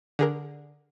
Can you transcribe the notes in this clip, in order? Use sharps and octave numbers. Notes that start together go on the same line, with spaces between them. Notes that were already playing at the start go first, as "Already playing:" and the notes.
D3 G#4 A#4